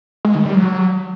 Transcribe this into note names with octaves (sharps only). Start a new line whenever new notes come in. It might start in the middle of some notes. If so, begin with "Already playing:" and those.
G#3
D#3
G3
F#3